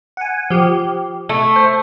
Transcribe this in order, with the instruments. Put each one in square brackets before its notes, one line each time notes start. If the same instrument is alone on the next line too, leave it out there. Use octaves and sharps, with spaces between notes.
[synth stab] F#5 G#5
F3 G4
[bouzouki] A3
[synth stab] C5